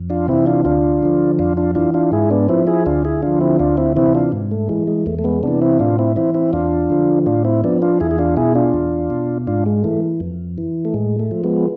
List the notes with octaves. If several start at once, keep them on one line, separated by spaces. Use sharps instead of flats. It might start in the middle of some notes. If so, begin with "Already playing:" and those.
Already playing: F2
D4 F4
C3 E3 C4 E4
D4 F4
D2 D4 F4
D3 F3
F2 D4 F4
D4 F4
E3 D4 F4
D4 F4
G#2 E4 G#4
B3 D4
F3 C4 E4
E4 G#4
D2 D4 F4
E4 G#4
D3 F3 D4 F4
C4 E4
D2 D4 F4
C4 E4
C3 E3 C4 E4
D4 F4
G#2
A3
E3 G#3
G#3
E2 A3
A3
G#3 B3
C3 E3 B3 D4
C4 E4
A2 D4 F4
C4 E4
E3 C4 E4
C4 E4
E2 D4 F4
D3 F3
A2 D4 F4
C4 E4
F3 B3 D4
D4 F4
E2 E4 G#4
G#4
D4 F4
B2 E4 G#4
D4 F4
E2
B2
G#2 D4 F4
G#3
E3 A3
F2
E3
A3
A2 G#3
A3
F3
G#3 B3